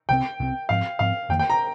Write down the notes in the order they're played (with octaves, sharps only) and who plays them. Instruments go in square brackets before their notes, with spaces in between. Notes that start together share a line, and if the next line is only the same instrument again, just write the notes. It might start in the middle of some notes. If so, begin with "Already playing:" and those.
[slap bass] C2 C3 F3 C4 [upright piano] G5
[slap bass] C2 C3 F3 C4
[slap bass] G#2 F3 C4 [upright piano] F5
[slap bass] G#2 F3 C4 [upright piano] F5
[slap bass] F2 D#3 A#3 [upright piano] G5
[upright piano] G5
A#5